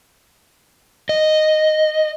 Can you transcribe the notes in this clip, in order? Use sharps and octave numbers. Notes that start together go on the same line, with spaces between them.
D#5